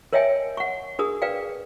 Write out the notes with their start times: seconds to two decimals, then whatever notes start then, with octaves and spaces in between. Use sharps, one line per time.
0.13 A#4 C#5 D#5 E5 G5 G#5
0.57 F#5 C#6
0.99 D4 G#4 A#4 D#6
1.22 B4 D5 F5 G5